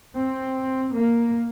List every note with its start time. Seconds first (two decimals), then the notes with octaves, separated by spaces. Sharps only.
0.16 C4
0.95 A#3